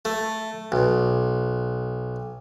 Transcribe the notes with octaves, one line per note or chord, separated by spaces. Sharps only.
A3
B1